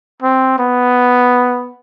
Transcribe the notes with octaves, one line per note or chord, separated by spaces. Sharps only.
C4
B3